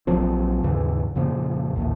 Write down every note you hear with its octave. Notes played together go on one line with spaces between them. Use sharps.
A#1 F3 F#3 C4
D#2 G#2 C#3 E3
F2 A#2 C#3 F3
A1 D#2 A2